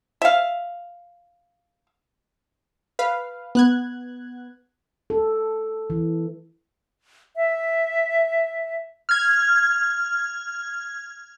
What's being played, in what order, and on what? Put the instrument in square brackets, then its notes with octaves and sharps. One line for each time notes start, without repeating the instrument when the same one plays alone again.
[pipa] E5 F5
[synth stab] B4 F5
B3 F#6 G#6
[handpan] A4
E3
[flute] E5
[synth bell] F6 G#6